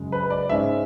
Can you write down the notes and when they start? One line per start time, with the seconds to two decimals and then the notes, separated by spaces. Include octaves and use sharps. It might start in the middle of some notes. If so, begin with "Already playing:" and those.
Already playing: F#2 C#3 G#3
0.12 B4
0.30 D5
0.49 G#2 G#3 C#4 E5